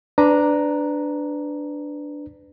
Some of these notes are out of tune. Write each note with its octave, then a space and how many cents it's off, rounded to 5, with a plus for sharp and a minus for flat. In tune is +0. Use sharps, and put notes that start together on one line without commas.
D4 +0 B4 +20 A#5 +0